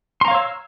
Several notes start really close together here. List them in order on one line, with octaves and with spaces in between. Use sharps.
C6 A#5 F5 C#5 E6